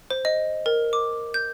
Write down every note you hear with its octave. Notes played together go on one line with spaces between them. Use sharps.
C5
D#5
A#4
D6
G6